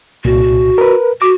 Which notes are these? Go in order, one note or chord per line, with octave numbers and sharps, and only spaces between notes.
C2 A#2 F#4
A#4 B4
F#4 D6